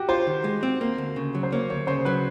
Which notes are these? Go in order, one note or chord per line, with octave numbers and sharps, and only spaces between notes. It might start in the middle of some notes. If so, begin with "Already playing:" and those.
Already playing: F#4 G4
F4 C5
D#3
G#3
C4
A#3
D2
C#3
F#3
C5
A#3 C#5
D2 C#5
C#3 C5
F#3 B4